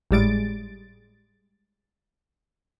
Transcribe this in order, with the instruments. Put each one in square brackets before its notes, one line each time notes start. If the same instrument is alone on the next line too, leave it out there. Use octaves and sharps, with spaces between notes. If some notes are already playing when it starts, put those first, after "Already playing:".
[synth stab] G#1 A2 G3 G#3 A6 D7